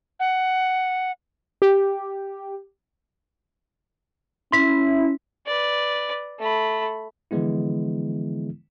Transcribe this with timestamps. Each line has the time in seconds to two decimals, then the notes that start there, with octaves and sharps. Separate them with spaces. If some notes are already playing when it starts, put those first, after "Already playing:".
0.20 F#5
1.62 G4
4.52 C#4 E4 C6 B6
5.47 B4 D5
6.40 A3 B5
7.31 D3 E3 F3 G#3 B3 E4